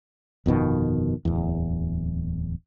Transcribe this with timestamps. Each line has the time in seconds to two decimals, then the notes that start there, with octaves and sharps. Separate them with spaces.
0.46 G1 F2 B2 D#3
1.25 D1 E2